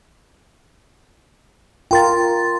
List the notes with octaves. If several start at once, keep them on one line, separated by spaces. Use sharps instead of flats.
F4 A#4 G5 C6 A6